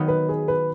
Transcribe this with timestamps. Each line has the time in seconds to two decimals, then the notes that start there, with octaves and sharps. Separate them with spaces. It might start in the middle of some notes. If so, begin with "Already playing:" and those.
Already playing: D#3 F#3 B3 D#4
0.08 B4
0.29 G#4
0.48 B4